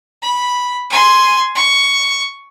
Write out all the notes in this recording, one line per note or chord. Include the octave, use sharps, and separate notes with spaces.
B5
G#5 C6
C#6